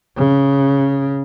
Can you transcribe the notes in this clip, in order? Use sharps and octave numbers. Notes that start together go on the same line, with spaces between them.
C#3